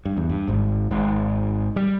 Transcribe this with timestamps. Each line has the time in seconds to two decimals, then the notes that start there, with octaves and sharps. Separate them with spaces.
0.05 G2
0.17 E2
0.29 G2
0.48 G#1 G#2
0.91 G#1 G#2
1.76 G3